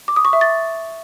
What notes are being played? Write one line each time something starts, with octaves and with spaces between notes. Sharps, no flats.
D6
D#6
C#6
E5
A6